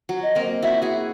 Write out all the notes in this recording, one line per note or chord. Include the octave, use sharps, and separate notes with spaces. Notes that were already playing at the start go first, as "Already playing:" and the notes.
F#3
D#5
A#3 C4
E4 F#4 E5
F#4 G#4